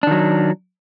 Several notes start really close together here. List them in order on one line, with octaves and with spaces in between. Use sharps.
D4 D#3 F#3